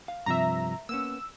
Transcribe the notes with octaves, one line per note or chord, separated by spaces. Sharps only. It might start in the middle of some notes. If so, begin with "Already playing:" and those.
F5
G2 C3 F3 E5 A#5
A#3 B3 C#4 E6